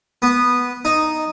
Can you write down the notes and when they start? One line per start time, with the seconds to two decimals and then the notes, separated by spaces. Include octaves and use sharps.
0.22 B3
0.85 D#4